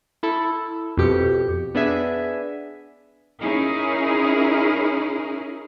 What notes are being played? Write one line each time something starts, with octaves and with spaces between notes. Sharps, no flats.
E4 A4
F2 B2 G4 C#7
B3 D4 G#4 E5 G#5
C#4 D#4 E4 G#4 A#4